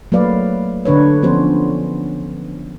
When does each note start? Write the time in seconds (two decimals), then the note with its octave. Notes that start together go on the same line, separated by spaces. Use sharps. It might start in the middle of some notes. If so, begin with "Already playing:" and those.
0.12 F#3 A3 A#3 B4 D5 F5
0.85 D3 D4 B4 C#5
1.23 F3 B3 C#4 F#4 C5